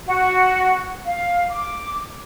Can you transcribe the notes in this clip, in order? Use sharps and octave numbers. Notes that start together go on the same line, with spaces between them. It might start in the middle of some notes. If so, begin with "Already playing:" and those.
F#4
F5
D6